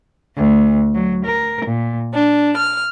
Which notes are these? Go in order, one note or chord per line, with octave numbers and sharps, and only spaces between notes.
D2
F#3
A#4
A#2
D4
F6